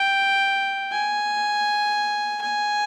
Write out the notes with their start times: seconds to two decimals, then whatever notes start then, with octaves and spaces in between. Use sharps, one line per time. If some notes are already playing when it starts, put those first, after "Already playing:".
Already playing: G5
0.92 G#5
2.41 G#5